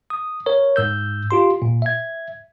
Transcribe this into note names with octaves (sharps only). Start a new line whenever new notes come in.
D#6
A#4 C#5
G#2 E6 G6
F4 G4 C6
A#2
E5 G#6